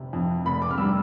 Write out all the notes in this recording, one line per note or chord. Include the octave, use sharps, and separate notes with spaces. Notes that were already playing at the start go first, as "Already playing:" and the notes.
Already playing: F1 C3
F2
F1 B5
D6
F6
G3 E6